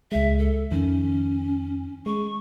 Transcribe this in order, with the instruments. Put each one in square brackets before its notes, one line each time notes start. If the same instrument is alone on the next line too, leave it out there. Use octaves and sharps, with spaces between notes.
[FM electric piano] C#2 G#3 [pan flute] E5
[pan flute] A4
[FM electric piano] F2 D#3 [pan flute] C#4
[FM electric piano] G#3 [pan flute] C#6